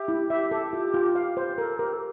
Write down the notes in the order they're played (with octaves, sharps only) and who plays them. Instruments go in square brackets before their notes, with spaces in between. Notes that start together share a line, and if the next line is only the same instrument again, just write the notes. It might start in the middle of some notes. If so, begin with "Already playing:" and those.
Already playing: [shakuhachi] G4 [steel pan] E5
[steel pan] E4
[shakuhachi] G4 [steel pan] E5
[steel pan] A4
F4
F4
F5
C5
[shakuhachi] A4 [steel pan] A#4
[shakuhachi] G4 [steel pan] A#4
[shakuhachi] A4